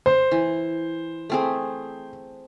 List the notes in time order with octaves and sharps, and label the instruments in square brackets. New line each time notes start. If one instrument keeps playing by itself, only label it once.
[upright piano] C5
[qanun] E3
A3 C4 G#4